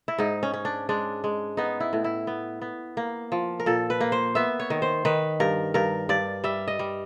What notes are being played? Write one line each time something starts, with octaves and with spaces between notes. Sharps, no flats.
E4
G#2 D#4
C#4
C#4
D4
G#3 D4
G#3
B3 D#4
E4
A2
E4
B3
B3
A#3
F3
A#4
A#2 A4
B4
A#3
C5
B3 E5
C#5
D#3
C5
D#3 B4
G2 A#4
G2 A#4
G2 D5
G3 E5
D#5
G3